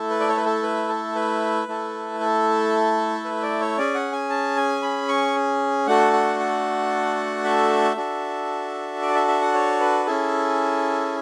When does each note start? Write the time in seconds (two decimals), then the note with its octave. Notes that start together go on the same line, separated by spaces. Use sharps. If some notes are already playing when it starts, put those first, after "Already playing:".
Already playing: A3 E4 A4
0.10 B4
0.20 D5
0.29 C#5
0.37 B4
0.46 A4
0.63 B4
0.89 A4
1.15 B4
1.68 A3 E4 A4
2.20 A4
3.25 B4
3.42 D5
3.61 C#5
3.78 C#4 G#4 D5
3.94 F#5
4.12 G#5
4.30 A5
4.56 G#5
4.82 B5
5.08 C#6
5.87 A3 D4 F#4 A4 F#5
6.13 F#5
6.40 F#5
7.44 E5
7.97 D4 F#4 A4
9.02 D5
9.15 E5
9.28 E5
9.41 F#5
9.54 C#5
9.80 B4
10.06 C#4 E4 G#4 A4